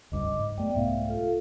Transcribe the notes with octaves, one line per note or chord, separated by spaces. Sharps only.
F1 C#2 G2 D#5 D6
G#2
F#2 A3 B3 D5 G5
C2 G#2 A3 E5 F5
F4 A4 F5